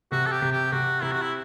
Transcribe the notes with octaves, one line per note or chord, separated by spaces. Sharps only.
C3 F#4
A4
G4
C3
G4
C3 F#4
C3 E4
F#4
E4